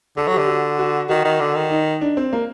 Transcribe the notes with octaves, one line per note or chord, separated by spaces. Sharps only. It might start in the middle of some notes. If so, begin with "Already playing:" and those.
D3 A4
F#3
D3 G4
F#4
F#4
D#3 F#4
D#3
D3
D#3
D#4
D4
C4
A#3